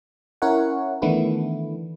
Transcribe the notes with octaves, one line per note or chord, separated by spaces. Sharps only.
C#4 E4 A#4 C#5 F#5
D#3 E3 A3 B3 D4 E4